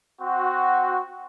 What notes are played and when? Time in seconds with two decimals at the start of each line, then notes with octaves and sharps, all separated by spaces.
0.21 C4 F#4